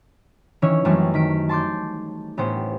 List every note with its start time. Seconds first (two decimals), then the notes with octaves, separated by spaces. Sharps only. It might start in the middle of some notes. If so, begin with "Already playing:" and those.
0.62 D#3 E3 C#4 E4 C#5
0.85 F#2 E3 G3 A3 C4
1.14 D#3 B6 D7
1.49 A5 C6 D6 G6
2.37 A1 B3 G4 C5